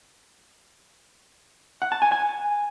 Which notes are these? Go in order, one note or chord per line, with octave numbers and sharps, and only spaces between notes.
F#5
A5
G#5
G#5